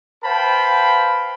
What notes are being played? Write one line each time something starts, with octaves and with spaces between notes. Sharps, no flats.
B4 C5 F5 G5 A5 B5